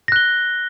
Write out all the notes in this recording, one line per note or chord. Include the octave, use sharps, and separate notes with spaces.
F#6 A#6 G7